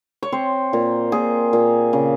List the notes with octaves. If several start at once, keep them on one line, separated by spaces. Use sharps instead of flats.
C#5
C4 C5
A#2
A#2 G#4
A#2
C#3